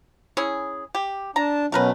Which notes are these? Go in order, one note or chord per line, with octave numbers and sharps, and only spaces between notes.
C#4 E4 G#4
G4
D4 A5 A#5
B2 F#3 A3 C#4 A#4 B4